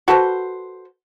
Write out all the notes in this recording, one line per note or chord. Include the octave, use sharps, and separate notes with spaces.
F#4 A4 B4 C5